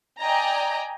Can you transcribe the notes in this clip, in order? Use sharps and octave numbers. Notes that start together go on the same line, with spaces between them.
D5 D#5 G5 G#5 A#5